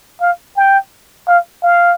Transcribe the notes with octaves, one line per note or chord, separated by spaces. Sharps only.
F5
G5
F5
F5